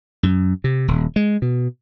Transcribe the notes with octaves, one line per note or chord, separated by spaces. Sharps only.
F#2
C3
D#1
G#3
B2